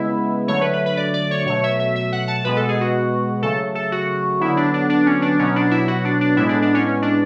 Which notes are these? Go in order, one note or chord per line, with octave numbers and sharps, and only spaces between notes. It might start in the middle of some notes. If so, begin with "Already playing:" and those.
Already playing: C#3 G#3 B3 E4
D3 F#3 A3 C#5
B4
B4
B4
D5
D5
C#5
B2 F#3 A3 C#5
E5
E5
E5
F#5
A5
B2 G#3 B3 B4
A4
G#4
F#4
C#3 F#3 A3 A4
A4
F#4
D3 F#3 B3 E4
D4
D4
D4
C#4
D4
B2 F#3 B3 C#4
D4
E4
F#4
D4
D4
A2 G#3 B3 E4
D4
D4
C#4
C#4
D4